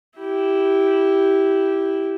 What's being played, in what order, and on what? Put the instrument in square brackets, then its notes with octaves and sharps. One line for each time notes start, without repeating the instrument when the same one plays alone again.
[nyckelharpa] E4 G4